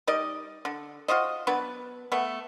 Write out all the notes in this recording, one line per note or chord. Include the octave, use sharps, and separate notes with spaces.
G3 D#4 D5 D#5
D3
F4 F#4 C5 D#5
F#3 B3 D4 B4
A3 B3